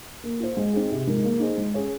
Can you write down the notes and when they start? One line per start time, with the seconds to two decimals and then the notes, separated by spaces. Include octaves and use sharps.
0.24 A#3
0.40 F4 C5
0.57 G#3
0.73 C4 D#4 G#4
0.91 C3
1.07 F3 G#3 D#4 A#4
1.24 A#3
1.40 D#4 G#4 C5
1.58 G#3
1.74 C#4 G#4 C#5